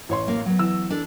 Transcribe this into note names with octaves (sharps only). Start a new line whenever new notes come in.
A1 C#5 C6
A#3 F5
F#3 B3
E3 E6
D4 A4